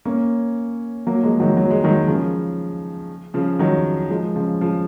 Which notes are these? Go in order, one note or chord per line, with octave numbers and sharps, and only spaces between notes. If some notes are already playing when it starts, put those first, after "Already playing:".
A#3 C#4
F#3 A#3
F3 G#3
D#3 F#3
F#3
G#3
D#3 F#3
C#3 F3
C#3 F3
D#3 F#3
F3 G#3
C#3 F3
C#3 F3